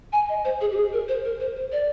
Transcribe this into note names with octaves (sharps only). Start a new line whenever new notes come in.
G#5
D#5
C5
G#4
G4
G#4
A#4
C5
A#4
C5
C5
D5